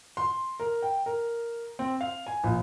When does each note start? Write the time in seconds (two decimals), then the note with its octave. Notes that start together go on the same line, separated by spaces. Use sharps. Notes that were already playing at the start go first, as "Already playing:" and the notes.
0.17 C6
0.60 A#4
0.82 G5
1.06 A#4
1.79 C4
2.01 F5
2.27 G#5
2.44 A#1